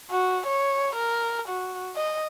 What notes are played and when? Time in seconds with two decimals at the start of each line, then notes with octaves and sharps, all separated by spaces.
0.11 F#4
0.47 C#5
0.95 A#4
1.48 F#4
1.96 D#5